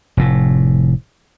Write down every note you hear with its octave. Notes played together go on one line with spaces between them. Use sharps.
F1 A2